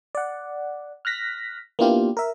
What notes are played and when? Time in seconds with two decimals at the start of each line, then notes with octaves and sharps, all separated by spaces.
0.15 D5 F#5
1.05 F6 F#6 A#6 B6
1.79 A#3 B3 D4 E4 F4 G4
2.17 A#4 E5